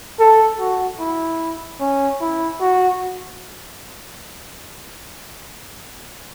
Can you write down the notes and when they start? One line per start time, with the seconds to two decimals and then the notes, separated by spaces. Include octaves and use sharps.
0.20 A4
0.60 F#4
1.00 E4
1.80 C#4
2.21 E4
2.61 F#4